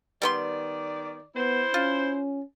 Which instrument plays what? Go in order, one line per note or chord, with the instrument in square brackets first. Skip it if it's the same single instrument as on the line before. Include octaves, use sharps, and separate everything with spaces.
[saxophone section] D#3 D5 [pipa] G3 B3 C6
[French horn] B3 [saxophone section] E4 C5
[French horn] C#4 [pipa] F4